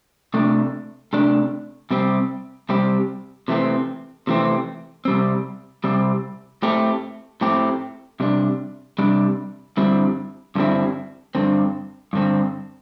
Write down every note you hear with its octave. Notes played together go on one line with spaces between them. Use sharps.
C3 A3 D4
C3 A3 D4
C3 G3 C4 G4
C3 G3 C4 G4
C3 E3 A3 C4
C3 E3 A3 C4
C3 G3 C4
C3 G3 C4
A2 A3 C4 G4
A2 A3 C4 G4
C3 G3 D4
C3 G3 D4
G2 D3 G3 C4 E4
G2 D3 G3 C4 E4
G2 D3 C4
G2 D3 C4